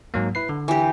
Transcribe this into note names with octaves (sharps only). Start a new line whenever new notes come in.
G#2 F#3 A#3
E4 B4 C7
D3
E3 G4